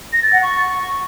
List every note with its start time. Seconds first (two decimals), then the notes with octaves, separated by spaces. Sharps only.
0.13 A#6
0.23 A6
0.33 F#5
0.43 C#6